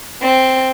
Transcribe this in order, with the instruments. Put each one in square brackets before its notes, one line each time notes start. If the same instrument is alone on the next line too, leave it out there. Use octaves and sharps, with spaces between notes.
[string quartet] C4